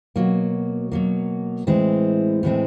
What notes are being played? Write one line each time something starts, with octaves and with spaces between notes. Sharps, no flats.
B2 F#3 A#3
B2 F#3 A#3
A2 E3 G#3 C4
A2 E3 G#3 C4